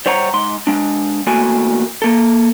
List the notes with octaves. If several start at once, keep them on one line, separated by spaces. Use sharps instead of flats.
G3 C5 C#5 F#5 A#5
G#2 C6
G#3 D4
E2 A3 A#3 F#4 G#5
A#3 A4